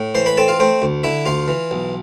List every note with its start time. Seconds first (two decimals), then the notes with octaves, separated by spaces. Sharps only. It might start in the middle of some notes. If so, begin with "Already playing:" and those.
Already playing: A2
0.15 E3 C5 C6
0.26 B4 B5
0.37 C4 A4 A5
0.48 F4 F5
0.59 A3 C4 C5
0.82 D2
1.03 D3 E4 E5
1.26 D2 F4 F5
1.48 E3
1.71 B1